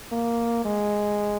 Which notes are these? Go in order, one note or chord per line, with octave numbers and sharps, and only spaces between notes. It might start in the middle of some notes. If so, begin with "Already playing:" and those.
A#3
G#3